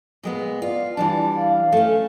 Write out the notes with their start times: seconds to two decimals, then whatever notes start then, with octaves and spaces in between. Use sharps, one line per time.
0.23 A#2 G#3 B3
0.62 F4 D5
0.97 E3 G3 D4 A5
1.37 F5
1.72 A3 C#4